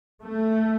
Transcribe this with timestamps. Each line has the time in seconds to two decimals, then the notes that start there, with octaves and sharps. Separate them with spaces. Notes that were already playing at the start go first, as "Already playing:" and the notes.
0.22 A3